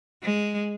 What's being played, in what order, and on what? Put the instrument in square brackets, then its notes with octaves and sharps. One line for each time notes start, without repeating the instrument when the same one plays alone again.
[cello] G#3